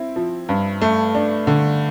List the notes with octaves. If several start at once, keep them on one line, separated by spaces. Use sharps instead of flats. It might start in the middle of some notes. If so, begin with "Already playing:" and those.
Already playing: C4 E4
F3
G2
A3
D4
D3